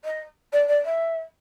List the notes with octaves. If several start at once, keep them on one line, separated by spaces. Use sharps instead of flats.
D#5
D5
D5
E5